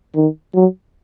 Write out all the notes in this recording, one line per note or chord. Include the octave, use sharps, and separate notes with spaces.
D#3
F#3